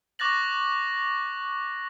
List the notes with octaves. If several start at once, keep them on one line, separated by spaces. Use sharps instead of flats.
C#6 D6 F#6 A6 A#6 F#7